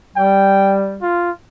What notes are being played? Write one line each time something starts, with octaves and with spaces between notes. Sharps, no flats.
G3 G5
F4